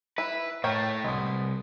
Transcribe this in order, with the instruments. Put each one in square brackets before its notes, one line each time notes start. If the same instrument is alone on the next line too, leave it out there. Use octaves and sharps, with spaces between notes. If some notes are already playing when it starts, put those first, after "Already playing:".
[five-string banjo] E4 [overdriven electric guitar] B4
[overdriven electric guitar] A2 A3 [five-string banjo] A#4 C#5 G5
[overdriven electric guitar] C2 [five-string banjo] G#3 B3